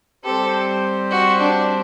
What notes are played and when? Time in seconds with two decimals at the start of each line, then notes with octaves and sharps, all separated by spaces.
0.24 G3 C4 G4 A4 C5
1.11 F#4
1.40 D4